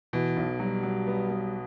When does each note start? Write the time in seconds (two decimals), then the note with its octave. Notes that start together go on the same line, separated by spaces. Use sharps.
0.13 B2 E3
0.37 B1
0.60 F#3 G3
0.83 F#3
1.07 B3
1.29 B3